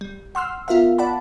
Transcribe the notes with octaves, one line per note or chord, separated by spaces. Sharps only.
G3
F#5 C6 E6 F6
B3 F4 A#4 E5 F5
D5 F#5 A5 B5